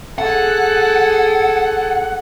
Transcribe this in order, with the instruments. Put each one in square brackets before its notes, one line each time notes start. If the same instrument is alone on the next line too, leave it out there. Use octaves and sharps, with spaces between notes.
[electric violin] G#4 A4 [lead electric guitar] F#5